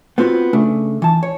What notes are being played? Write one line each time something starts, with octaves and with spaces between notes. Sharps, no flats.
B3 C4 F4 F#4 B4
C#3 A3 D4
E3 A5
C#5